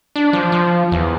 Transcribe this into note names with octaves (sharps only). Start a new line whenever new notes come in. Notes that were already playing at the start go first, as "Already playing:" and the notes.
D4
F3
F3
E2